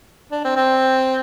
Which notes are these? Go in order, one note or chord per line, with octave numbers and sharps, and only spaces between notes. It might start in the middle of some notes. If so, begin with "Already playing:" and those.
D4
C4
C4